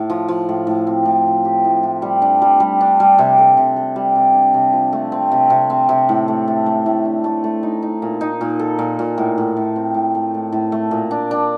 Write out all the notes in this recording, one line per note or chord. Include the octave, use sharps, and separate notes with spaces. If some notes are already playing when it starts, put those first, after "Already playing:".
Already playing: A2
F3
F3
A2
A2
C4
A2
F3
G4
A2
A2
G3
D4
G3
G3
D4
G3
C3
A4
C3
A4
G3
C3
D4
C3
F3
A3
C4
C3
C3
C4
C3
A2
A3
A3
A3
A2
D4
A3
A3
D#4
D#4
A#2
D#4
A#2
A4
A#2
A#2
A2
A2
A2
C4
A2
A3
A2
A2
A3
A#2
D4
D4